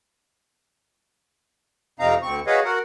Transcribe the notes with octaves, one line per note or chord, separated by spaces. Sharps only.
F2 C3 C4 D#4 F5 A#5
D2 C4 C#6
F#4 G#4 B4 C#5 D#5 F5
F#4 A#4 F#5